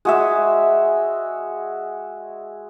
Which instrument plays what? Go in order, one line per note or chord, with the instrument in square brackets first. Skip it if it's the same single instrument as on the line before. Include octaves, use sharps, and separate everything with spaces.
[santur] G#3 F#4 E5